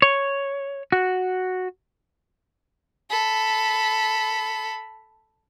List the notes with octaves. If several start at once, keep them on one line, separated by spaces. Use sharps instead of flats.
C#5
F#4
A4 B5